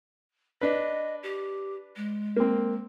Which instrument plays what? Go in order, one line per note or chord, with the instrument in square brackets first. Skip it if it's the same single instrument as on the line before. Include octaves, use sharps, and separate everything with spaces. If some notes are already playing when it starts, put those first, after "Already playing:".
[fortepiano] D4 B4 [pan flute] D#5
[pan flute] G4
G#3
[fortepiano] A#3 C4